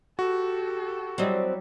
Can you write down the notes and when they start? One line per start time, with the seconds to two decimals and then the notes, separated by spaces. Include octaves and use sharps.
0.19 F#4 G4 A4
1.18 F#3 G3 C4 E4 D#5